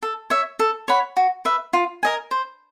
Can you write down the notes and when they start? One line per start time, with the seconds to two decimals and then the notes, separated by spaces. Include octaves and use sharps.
0.03 A4
0.30 C#5 E5
0.59 A4
0.88 C#5 F#5 B5
1.17 F#4
1.45 B4 E5
1.73 F4
2.03 A#4 D#5 G#5
2.31 C5